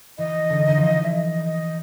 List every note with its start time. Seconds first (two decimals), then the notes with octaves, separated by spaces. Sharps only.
0.18 E3 D#5
0.50 D3
0.59 D#3
0.68 D3
0.77 E3 F3
1.05 E5
1.13 D#5
1.45 D#5